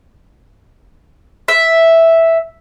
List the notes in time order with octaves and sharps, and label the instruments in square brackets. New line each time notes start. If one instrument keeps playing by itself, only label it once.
[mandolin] E5